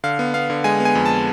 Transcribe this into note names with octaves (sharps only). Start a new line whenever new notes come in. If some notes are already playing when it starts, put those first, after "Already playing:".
D3 F5
B3
B3 F5
D3
G#3 G#5
B3
G#5
F2
A5